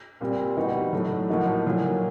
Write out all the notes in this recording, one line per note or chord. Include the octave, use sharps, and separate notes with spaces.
A#2 G3 C4
E3 G3 B3 D#4 F#4
A2 F#3 A3
A2 F3 A#3 D#4 F#4
A#2 F#3 A#3